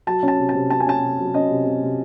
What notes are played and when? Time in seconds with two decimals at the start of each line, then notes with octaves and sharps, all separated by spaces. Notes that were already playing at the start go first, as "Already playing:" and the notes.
0.07 F#3 A5
0.23 C#4
0.28 A5
0.39 C3
0.49 A5
0.54 C3
0.70 C#4 A5
0.80 G#5
0.87 C#4 A5
1.03 C3
1.19 F#3
1.34 C#4 D#5
1.50 C3
1.66 C3
1.82 C3